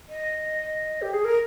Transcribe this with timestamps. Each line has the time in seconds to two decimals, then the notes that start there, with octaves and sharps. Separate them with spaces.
0.09 D#5
1.02 G4
1.13 G#4
1.24 A#4